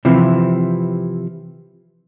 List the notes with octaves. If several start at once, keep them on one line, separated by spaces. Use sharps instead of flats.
C3 E3 F3 C4